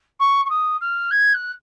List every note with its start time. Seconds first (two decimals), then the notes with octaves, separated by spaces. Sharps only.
0.19 C#6
0.45 C#6
0.49 D#6
0.81 F6
1.11 G#6
1.34 F#6